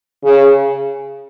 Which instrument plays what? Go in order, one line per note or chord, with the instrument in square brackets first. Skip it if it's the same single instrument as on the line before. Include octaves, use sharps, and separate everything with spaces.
[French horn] C#3